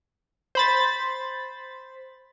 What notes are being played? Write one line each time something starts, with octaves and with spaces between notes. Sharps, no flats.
C5 B5 A6